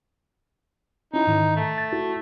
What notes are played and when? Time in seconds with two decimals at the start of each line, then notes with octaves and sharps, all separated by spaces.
1.14 C#4 D#4 E4
1.27 G#2 D#3
1.56 A3
1.78 A6
1.92 E4 F#4